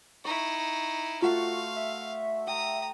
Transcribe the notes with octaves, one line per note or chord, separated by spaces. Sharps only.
D#4 E4 C#6
A3 F4 F#4 C5 F5
E5
G5 A#5 D#6